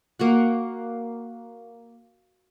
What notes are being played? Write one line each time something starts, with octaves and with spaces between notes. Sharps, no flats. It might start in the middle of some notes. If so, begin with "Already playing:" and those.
A#3 F#4 F#5